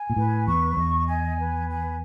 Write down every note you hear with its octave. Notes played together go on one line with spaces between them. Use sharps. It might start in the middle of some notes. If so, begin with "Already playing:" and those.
Already playing: G#5
A#2
A2 B4
E2 C#6
E2 D#5
G#5
B4
G#5